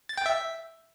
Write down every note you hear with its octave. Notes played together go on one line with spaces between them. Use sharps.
A6
G5
E5